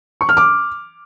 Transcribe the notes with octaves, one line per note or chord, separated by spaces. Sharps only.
C#6
F6
D6